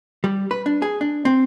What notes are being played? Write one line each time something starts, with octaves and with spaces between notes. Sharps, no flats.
G3
B4
D4
G#4
D4
C4